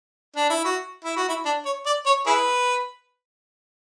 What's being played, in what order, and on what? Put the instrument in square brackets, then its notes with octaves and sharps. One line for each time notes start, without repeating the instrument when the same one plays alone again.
[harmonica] D4
E4
F#4
E4
F#4
E4
D4
C#5
D5
C#5
E4 G#4 B4